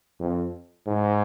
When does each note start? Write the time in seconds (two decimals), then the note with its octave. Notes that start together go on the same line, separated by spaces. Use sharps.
0.20 F2
0.87 G#2